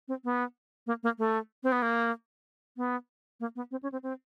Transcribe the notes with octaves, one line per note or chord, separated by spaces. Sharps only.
C4
B3
A#3
A#3
A3
C4
B3
A#3
B3
A#3
B3
C4
C#4
C4
C4